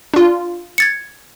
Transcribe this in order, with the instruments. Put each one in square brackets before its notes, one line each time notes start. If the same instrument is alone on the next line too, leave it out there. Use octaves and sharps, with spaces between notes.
[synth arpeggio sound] D4 F4
[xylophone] G#6 A6 C#7